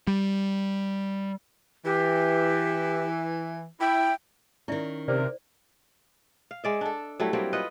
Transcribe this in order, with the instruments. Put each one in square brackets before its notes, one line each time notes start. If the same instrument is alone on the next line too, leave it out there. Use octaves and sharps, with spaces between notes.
[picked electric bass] G3
[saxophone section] E3 [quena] G4
[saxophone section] E4 [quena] G5
[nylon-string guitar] D#3 C#4 [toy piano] E4 D5 E5
[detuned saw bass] C3 [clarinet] A#4 [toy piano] C5 D5
[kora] F5
G#3 D5 E5
D4 A4
F#3 G3 A3 E4
F#3 G3 A#3 C4
F4 B4 D#5 F#5